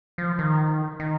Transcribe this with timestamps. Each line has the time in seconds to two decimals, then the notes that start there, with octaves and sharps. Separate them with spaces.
0.18 F3
0.39 D#3
1.00 D#3